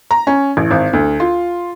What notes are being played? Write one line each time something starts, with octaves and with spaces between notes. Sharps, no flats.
A#5
C#4
A1
G#1
D2
F4